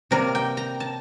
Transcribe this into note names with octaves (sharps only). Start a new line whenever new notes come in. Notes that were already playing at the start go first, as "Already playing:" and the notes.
C3 G3 A#3 A#4
G5
A#5
A5